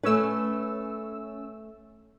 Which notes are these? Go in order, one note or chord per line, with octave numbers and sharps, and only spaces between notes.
A3 C#4 B4 E6